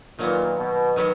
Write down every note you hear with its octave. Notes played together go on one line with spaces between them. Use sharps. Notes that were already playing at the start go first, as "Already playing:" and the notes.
A#2 D#3 F#3 B3
B2
D#3 F#3 B3